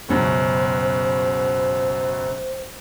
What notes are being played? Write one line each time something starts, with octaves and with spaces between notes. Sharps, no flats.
C#2 F#2 B2 C5